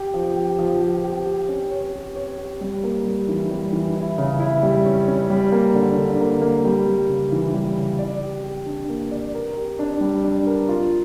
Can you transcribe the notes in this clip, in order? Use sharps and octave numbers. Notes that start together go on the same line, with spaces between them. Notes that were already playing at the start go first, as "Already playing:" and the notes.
Already playing: G4
F3
G4
F3
G4
G4
G4
C#4
C#5
G4
C#5
G4
G3
A#3
G3
E3
G3
E3
E4
C#3
E4
G3
C#4
C#4
G3
A#3
D3
D3
A#3
A#3
G3
G3
C#3
E3
G3
C#3
D5
G4
G4
D4
A#3
D5
A#4
G4
D4
G3
D4
A#4
F4